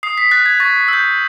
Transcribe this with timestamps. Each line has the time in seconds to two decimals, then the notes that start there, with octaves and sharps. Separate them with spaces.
0.03 D#6 C7
0.18 B6
0.31 F#6 A6
0.46 G#6
0.60 C#6 A6
0.88 E6 G6